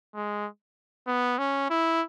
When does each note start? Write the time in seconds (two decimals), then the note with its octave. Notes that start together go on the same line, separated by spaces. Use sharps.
0.15 G#3
1.07 B3
1.38 C#4
1.70 E4